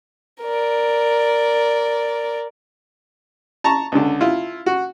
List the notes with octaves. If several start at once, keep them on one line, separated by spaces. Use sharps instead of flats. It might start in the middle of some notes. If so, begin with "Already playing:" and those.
A#4 D5
A5 A#5 C#6
C#2 D3
E4 F4
F#4